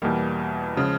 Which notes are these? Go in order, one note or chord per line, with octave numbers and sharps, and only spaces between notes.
E2 B2 G3 A#3
C#3 F3 G#3